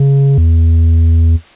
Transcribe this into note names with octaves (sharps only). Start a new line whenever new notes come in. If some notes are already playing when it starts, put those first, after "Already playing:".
Already playing: C#3
E2